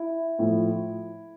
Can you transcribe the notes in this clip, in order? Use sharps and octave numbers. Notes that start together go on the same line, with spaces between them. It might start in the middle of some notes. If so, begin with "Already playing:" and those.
Already playing: E4
A2 F3